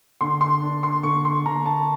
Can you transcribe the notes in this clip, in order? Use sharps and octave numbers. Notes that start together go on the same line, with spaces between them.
D3 C6
C6
D4
C6
D3 C#6
C6
D3 A#5
A5